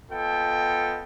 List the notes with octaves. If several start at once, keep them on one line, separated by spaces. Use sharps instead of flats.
B3 F4 A4 D#5 G5